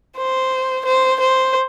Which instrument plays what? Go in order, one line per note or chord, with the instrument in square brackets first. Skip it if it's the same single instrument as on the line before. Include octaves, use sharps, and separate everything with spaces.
[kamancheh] C5
C5
C5